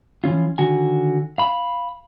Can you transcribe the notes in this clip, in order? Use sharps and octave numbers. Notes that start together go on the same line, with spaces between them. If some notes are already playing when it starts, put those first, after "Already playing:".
E3 F3 C#4 F4
D3 D#3 F#4 G#5
F5 B5